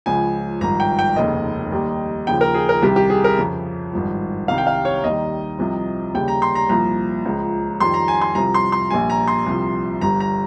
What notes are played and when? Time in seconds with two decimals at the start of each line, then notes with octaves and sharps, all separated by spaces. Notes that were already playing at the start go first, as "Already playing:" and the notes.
0.06 C#2 C#3 F3 G#5
0.61 G#1 G2 F3 A#5
0.80 G5
0.99 G5
1.16 F1 D#2 C#3 D#5
1.72 D#2 D#3 G3
2.27 D#2 C#3 F3 G5
2.41 A#4
2.54 G#4
2.69 A#4
2.82 C2 C3 D#3 G4
2.96 G4
3.10 G#4
3.24 A#4
3.38 F2 C#3 F3
3.93 G#1 G2 F3
4.48 C2 C3 D#3 G3 F5
4.58 G5
4.67 F5
4.85 C#5
5.04 D#2 D#3 G3 D#5
5.58 C2 C3 F3
6.14 D#2 C#3 G3 G5
6.28 A#5
6.42 C6
6.55 A#5
6.69 C2 A#2 F3 A#5
7.25 C#2 C#3 F3
7.80 F2 D#3 G3 C6
7.94 A#5
8.08 G#5
8.22 C6
8.35 C2 C3 F3 A#5
8.54 C6
8.72 C6
8.91 A#1 A#2 G3 G#5
9.10 A#5
9.28 C6
9.46 C2 C3 F3
10.01 G1 G2 G3 A#5
10.20 A#5